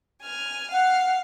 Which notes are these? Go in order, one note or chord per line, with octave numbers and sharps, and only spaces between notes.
G#5 F6
F5 F#5